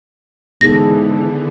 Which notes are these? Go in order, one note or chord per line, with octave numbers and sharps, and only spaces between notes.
G#2 D3 E3 B3 G#4 A4 A#6